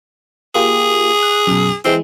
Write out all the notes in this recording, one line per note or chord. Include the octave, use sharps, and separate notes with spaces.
A#3 F4 G4 G#4
F#6
B1 F#2
E3 G#3 C4 E4